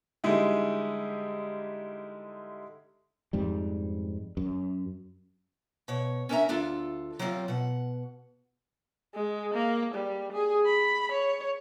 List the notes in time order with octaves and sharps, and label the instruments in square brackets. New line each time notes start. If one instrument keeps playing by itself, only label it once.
[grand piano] D3 G3 G#3 D#4 E4
[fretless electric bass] F2 G#2 G3
F#2
[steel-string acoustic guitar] B2 C#5
C#4 D4 A#4 D5 E5 A#5
D2 D4 F4 A4
F#3 G3 A#3 C4 C#4 F4
B2 F#5
[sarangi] G#3
A#3
G3
G#4
B5
C#5